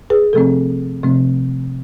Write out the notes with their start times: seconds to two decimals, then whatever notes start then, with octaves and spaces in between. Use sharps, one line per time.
0.10 G#4 B4
0.33 C3 F3 A3 C4 A4
1.04 C3 F3 A3 C4